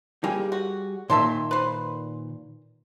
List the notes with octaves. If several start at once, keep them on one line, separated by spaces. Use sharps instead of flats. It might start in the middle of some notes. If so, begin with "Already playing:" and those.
G3 A#3 G4 G#4
F#4
A#2 D#3 E5 A5 C6
B4 C5